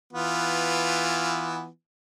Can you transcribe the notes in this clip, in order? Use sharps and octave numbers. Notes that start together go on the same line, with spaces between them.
E3 B3 F4